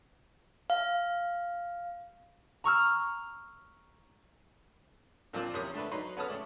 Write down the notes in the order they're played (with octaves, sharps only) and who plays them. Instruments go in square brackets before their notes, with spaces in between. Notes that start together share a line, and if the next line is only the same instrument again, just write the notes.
[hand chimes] F5
[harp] A#5 C#6 E6 F6
[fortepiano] A#2 F3 C4 D4 F4 D5
E2 C3 A#3 C#4 D#6
D3 A3 D4 B4
F#3 D#4 B4 C6
B3 C#4 A4 B4 D#6 F6
C#3 A3 D5